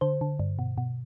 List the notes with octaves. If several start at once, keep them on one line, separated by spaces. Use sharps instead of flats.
D3 C5
D3
G2
B2
B2